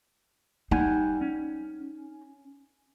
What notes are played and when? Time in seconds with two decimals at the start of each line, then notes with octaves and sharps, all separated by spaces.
0.71 G3 D#4 F#5 G#5
1.21 C#4